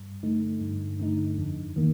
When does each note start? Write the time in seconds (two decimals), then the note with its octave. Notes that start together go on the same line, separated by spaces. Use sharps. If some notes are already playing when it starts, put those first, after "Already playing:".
Already playing: G2
0.23 D3 A3 D#4
0.61 G2
1.00 D3 A3 D#4
1.38 F2
1.76 D#3 A#3